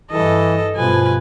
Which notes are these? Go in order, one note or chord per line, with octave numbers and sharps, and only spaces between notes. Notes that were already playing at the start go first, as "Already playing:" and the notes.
G2 E3 A4 D#5
G2 B2 F3 B4 G#5